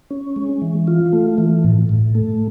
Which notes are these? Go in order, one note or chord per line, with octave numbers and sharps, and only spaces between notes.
C#4
G#3
E3
F4
A3
E3
A2
A2
A3